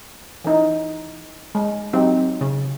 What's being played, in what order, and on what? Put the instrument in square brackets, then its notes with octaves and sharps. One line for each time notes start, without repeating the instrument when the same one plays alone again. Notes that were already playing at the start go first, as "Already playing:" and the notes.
[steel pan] E3 D#4
G#3
[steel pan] F#3 D#4 G4 [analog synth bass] C4
[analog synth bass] C#3